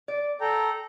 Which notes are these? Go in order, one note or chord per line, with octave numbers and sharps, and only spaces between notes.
D5
A4 G5 A#5